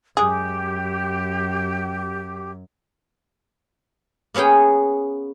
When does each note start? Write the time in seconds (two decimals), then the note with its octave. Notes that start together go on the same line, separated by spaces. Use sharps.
0.17 F#2 G#3 G4 G#4
4.34 A#3 B3 C#4 G#4 G5